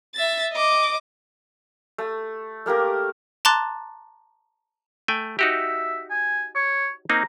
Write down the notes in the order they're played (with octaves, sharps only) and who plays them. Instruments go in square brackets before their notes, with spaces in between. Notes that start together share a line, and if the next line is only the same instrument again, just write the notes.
[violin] E5 A6
D#5 D6
[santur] A3
A3 A#3 G4 A#4
[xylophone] A5 A#5 C6 D6 F#6 A6
[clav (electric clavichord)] A3 G5 G#5
[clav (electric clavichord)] D#4 F#4 G4 [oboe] E5
[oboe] G#5
C#5
[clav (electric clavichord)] A#3 C4 D#4 [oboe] A#5